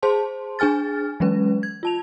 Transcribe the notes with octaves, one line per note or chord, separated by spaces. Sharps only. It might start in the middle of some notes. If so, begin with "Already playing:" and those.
G#4 C5 A5 C6
D4 G#4 G#5 F6 A6
E3 F#3 G#3 C#4 B4
G#6
F4 A5 F7